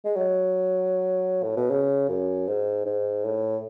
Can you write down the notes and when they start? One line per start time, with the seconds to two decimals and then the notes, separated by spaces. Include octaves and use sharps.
0.05 G#3
0.16 F#3
1.43 A2
1.57 B2
1.70 C#3
2.09 F#2
2.48 G#2
2.86 G#2
3.25 A2